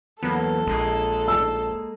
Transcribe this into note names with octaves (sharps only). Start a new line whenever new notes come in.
E2 F#3 A#3 B3 A4
A#1 G#3 A#3 G#4
E6